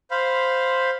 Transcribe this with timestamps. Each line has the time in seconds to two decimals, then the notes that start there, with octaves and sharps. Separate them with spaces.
0.11 C5 F5 B5